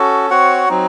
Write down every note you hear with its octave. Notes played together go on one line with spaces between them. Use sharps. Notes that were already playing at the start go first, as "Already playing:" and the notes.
Already playing: C#4 F#4 A4
C4 F#4 C#5 F#5
F#3 C4 D#4